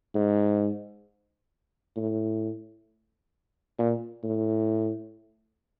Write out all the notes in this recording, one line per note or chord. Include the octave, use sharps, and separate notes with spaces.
G#2
A2
A#2
A2